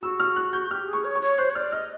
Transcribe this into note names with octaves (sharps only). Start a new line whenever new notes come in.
F#4 E6
F6
F#6
G6
G4 F6
G#4
C#6
C#5
C#6
C#5
C5 F#6
C#5
D5 F6
D#5 F6